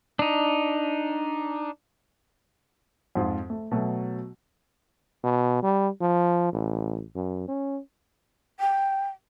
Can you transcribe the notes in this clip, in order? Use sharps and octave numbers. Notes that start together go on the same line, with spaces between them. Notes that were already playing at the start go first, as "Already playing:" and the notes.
D4 D#4
F2 G#2 F4
A3
B2 F#3 A3
B2
G3
F3
A1
F#2
C#4
G5